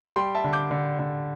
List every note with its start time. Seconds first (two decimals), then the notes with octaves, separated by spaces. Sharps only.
0.16 G3 G5 C6
0.35 E5 A5
0.44 D3
0.53 D6 G6
0.71 D3
0.99 D3